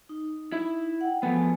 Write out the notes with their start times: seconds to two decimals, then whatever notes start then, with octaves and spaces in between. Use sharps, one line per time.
0.09 D#4
0.52 E4 E5
1.01 F#5 G5
1.23 F3 A3 B3 G#5